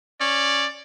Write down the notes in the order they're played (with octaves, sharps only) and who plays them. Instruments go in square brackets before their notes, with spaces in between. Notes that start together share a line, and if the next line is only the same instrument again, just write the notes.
[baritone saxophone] C#4 [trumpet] D5